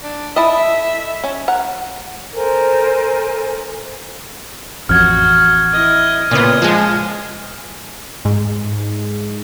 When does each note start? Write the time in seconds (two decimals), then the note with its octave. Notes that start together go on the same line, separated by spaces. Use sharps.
0.03 D4
0.36 E4 A4 D#5 E5
1.24 C#4
1.48 A#4 F#5
2.34 A4 A#4 C5 G#5
4.89 A1 F2 F#4 F6 G#6
5.73 E4 D#5
6.31 A#2 C#3 B3 D#5
6.62 F3 G#3
8.25 G#2